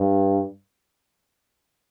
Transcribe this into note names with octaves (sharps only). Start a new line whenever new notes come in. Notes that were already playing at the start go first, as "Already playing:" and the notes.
Already playing: G2